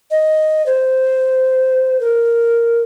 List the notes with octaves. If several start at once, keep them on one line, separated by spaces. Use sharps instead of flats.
D#5
C5
A#4